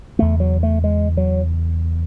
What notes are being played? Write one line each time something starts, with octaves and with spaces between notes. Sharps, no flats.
E2 C#3 A3
F#3
A3
G#3
F#3